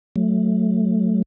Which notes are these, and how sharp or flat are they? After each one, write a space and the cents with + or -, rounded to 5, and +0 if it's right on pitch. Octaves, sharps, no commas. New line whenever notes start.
F#3 +0 A3 +0